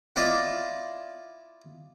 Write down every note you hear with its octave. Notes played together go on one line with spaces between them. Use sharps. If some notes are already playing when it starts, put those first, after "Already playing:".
E4 F4 D5 D#5